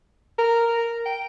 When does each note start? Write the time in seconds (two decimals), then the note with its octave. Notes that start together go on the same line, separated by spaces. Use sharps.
0.38 A#4
1.06 G5